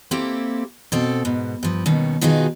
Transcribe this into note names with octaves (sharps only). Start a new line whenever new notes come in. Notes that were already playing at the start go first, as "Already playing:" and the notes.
A#3 C4 E4 G4 A4
B2 C4 A4
G#2 B2
G2 F3
D#2 B2 D#3 C#4
B2 D#3 D#4 F4 F#4 G#4